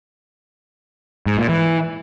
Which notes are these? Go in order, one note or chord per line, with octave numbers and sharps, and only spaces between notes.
G#2
A#2
E3